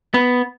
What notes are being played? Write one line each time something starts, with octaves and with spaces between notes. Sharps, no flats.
B3